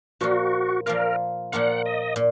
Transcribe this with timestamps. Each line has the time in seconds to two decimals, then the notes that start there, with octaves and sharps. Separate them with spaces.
0.20 A#2 F3 A#3 F4 F#4
0.86 A#2 F3 A#3 F4 A#4
1.52 A#2 F3 A#3 F4 F#5
1.86 D#5
2.16 A#2